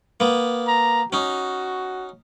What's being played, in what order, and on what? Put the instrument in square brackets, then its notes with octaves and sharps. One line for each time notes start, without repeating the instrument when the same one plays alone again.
[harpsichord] A#3 B3
[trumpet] A#5
[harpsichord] C#4 D#4 [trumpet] F#4